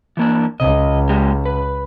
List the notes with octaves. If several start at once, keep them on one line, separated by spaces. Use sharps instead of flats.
E3 A#3 D4
C#2 D#5
G#3 G4
B4